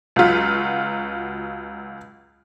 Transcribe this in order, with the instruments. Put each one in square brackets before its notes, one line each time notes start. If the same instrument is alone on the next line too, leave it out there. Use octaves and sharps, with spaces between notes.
[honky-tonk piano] C#2 F#3 F4 B6